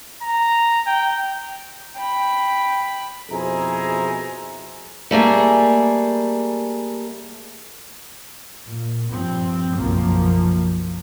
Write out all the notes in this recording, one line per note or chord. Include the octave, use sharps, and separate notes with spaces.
A#5
G5
G5 B5
F2 B2 E4 G#4 C5 A#5
G3 A3 A#3 G#4
A#2
G2 F3 C4
F#1 B1 F#2 F3 A#3